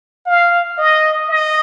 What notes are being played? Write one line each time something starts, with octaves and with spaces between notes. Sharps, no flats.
F5
D#5
D#5